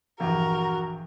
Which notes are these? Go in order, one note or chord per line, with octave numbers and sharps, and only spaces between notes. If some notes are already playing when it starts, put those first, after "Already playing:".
A#1 E2 G2 F#4 A#4